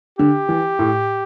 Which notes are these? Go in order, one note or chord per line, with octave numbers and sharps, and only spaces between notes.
D3 G4
E3
A2